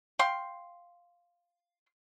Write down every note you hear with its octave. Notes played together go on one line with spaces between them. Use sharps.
F5 G5 C6